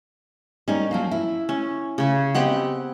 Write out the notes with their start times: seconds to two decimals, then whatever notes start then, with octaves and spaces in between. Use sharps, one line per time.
0.68 G3 C#4 D#4 A#4
0.91 F3 F#3 A#3
1.11 E4
1.49 C#4
1.98 C#3 C#4
2.35 B3 C4 G4 D#5 F#5 G5